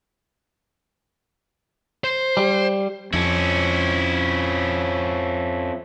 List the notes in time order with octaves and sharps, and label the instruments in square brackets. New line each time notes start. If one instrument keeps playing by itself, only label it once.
[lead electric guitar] C5
[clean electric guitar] G3
[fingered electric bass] F2 [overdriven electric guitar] C#4 E4